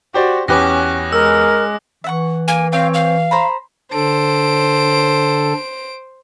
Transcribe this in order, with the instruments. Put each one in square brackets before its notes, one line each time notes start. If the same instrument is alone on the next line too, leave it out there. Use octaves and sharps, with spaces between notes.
[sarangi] F#4 [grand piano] G4 C5 D5
[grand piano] E2 G4 B4 [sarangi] C#4 [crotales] D6 F#6 A#6
[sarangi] G#3 [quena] A#4 [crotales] E6
[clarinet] E3 [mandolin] E5 F#5 C#6
[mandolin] A#3 [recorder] G#5
[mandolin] C4 C#5 G5 [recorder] F5
[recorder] F5
[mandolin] C5 A#5 B5
[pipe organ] D3 A4 [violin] C5 D7